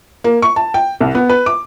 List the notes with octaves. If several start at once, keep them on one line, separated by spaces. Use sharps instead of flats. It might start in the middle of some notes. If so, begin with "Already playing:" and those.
A#3
C#6
A5
G5
C2
B3
B4
D6